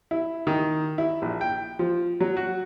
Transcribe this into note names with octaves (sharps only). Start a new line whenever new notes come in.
E4
D#3
E4
A#1
G5
F3
F#3
F#4